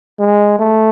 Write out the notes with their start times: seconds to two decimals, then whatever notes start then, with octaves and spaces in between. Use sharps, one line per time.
0.19 G#3
0.59 A3